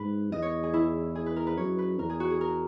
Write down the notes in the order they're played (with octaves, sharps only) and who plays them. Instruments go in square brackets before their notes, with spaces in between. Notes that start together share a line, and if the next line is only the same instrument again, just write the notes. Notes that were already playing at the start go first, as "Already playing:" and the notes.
Already playing: [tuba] G#2 [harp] B4
[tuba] E2 [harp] D#5
[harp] C#5
G#4
E4
G#4
B4
A#4
B4
[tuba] F#2 [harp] C#5
[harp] B4
[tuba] E2 [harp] A#4
[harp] G#4
F#4
G#4
A#4